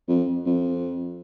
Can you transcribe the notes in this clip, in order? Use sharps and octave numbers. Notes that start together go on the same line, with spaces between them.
F2
F2